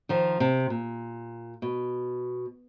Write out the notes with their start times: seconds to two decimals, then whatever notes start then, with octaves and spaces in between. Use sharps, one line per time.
0.09 D#3 F3
0.40 C3
0.70 A#2
1.62 B2